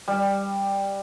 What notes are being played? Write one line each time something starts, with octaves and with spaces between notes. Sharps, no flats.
G3